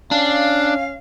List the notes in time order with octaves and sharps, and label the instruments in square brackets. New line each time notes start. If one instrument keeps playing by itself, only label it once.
[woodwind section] C#4 F5 [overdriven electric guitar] D4